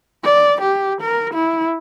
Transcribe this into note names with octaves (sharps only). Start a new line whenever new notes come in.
D5
G4
A#4
E4